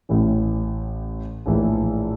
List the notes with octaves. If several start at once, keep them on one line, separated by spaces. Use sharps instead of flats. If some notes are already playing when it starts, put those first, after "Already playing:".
A1 A2 E3
A#1 A2 E3